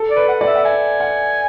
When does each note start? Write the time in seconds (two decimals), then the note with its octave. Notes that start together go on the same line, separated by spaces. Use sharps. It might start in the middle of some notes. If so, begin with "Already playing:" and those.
Already playing: A4
0.10 D5
0.16 B4
0.28 F#5
0.41 D5
0.47 E5
0.55 F#5
0.65 E5 G#5
1.00 F#5